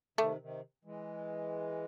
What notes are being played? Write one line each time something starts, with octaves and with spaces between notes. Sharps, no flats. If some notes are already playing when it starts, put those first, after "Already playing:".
C3 D#3 A3
C3 D#3
E3 G#3